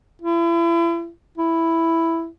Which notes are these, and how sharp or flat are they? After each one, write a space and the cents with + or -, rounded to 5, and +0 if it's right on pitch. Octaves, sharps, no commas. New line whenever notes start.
E4 +35
E4 +0